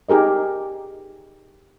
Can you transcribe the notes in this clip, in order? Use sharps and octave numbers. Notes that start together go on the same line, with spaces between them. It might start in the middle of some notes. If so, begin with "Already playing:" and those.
D#4 G4 G#4 A#4 D#5